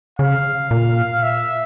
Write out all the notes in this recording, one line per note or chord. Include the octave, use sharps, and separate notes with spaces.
C#3 F5
A#2
E5